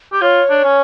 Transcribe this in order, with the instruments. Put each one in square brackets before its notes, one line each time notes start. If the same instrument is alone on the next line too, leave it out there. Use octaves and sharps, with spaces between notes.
[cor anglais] G4
[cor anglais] F4 [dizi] C#5
[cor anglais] D4
C#4